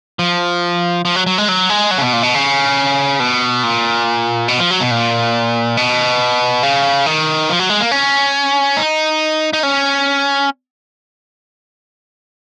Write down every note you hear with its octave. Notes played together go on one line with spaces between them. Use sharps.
F3
F3
F#3
F#3
G#3
F#3
G#3
F#3
C#3
B2
A#2
B2
C#3
B2
A#2
B2
F3
F#3
B2
A#2
B2
C#3
D#3
F3
F#3
G#3
A#3
C#4
D#4
D#4
C#4